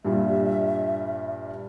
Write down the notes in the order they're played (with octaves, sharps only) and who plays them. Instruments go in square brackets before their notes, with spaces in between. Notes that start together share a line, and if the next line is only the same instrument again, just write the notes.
[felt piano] G2 A#2 G3 [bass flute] E5